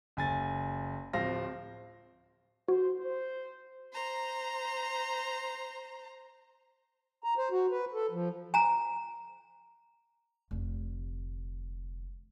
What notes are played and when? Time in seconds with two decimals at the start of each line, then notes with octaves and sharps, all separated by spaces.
0.17 F#1 G#5 A6
1.13 D1 F3 C4 F5 A#6
2.68 F#4 C5
3.00 C5
3.93 C5 A#5
7.24 A#5
7.38 C5
7.51 F#4
7.71 B4
7.94 A4
8.11 F3
8.54 G#5 A#5
10.51 F1 D3